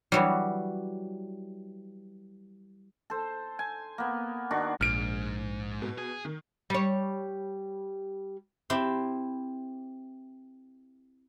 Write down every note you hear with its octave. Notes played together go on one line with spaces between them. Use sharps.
E3 F#3 G3
A4 C5
G#5
A#3 B3
D#3 D4 F#4
A#1 G#2 F6 D7
B2
G#4
D#3
G3 C#5
C4 E4 G4